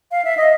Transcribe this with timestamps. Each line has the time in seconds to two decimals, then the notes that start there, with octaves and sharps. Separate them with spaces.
0.11 F5
0.25 E5
0.37 D#5